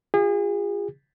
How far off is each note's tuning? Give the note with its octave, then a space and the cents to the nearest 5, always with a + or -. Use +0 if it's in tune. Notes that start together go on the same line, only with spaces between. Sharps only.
F4 +10 G#4 -35